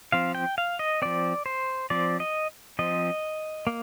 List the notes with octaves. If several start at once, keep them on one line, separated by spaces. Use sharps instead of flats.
F3 C4 F5
G5
F5
D#5
F3 C4 D5
C5
F3 C4 D5
D#5
F3 C4 D#5
A#3